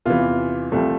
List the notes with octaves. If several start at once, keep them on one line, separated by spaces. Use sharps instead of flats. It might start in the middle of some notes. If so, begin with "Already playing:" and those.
E2 C3 E3 F4
C2 C3 F3 A3